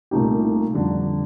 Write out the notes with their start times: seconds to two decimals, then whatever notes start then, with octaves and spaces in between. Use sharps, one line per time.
0.11 C2 A#2 A3 D#4 G4
0.74 F2 D3 G3 D4